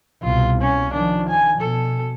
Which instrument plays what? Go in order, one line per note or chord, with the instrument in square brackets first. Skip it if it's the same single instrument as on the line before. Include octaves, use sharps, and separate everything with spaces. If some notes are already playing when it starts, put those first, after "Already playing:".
[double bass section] C2 B2 [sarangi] F4
[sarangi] C#4
[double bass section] D#3 F3 [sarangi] D4
[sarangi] G#5
[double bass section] B2 [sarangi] A4